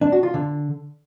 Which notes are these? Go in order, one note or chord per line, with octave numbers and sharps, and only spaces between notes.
D4
F#4
F4
D3